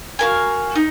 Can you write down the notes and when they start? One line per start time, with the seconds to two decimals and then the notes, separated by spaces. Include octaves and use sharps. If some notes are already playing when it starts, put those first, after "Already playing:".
0.19 F#4 A#4 F5 G#5
0.76 D#4